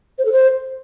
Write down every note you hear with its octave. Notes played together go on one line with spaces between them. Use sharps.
C5
A4
C5